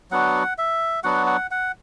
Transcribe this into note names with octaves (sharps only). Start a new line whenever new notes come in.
F#3 B3 D4 F#4 F#5
E5
F#3 B3 D4 F#4 F#5
F#5
F#5